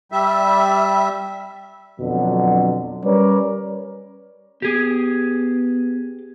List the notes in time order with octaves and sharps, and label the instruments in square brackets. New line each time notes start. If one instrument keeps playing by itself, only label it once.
[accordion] G3 E5
[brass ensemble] F2 B2 D3 F#3
G3 C#4 A#4 B4 C#5 D5
[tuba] B3 [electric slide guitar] G4 G#4